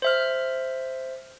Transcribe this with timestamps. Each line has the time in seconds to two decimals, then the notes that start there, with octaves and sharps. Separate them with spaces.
0.02 C5 E5 F6